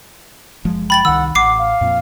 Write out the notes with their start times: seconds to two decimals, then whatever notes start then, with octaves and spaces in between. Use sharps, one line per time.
0.65 F#1 F3 G#3
0.90 G5 B5 A6 F#7
1.05 C2 D#3 F#5 E6
1.35 A1 F#5 D6 C7
1.58 F5
1.81 F2 A#2